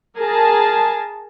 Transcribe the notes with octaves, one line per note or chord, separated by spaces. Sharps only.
G#4 A#4 A5